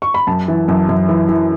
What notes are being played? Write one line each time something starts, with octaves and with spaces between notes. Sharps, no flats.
C#6
B5
F#2 A5
E3
F#2
F#2
E3
E3